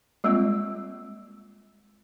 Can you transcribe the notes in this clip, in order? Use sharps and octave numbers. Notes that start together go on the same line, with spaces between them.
G3 G#3 A#3 C4 F4